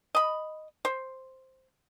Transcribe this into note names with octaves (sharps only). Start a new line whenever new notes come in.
D#5 B5
C5